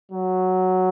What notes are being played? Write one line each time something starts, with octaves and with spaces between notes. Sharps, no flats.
F#3